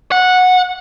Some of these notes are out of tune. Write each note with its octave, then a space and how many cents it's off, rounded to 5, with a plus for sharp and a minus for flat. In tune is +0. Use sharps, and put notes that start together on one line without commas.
F#5 -15